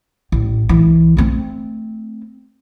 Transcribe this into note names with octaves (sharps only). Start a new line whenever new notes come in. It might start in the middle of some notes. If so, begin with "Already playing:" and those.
A1
C2 E3
A3 C4